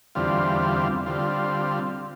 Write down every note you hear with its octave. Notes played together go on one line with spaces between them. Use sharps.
E2 D3 G3 C4 F4
D3 G3 C4 F4